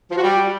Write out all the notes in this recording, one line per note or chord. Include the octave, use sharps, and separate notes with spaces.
F3
F#4
G3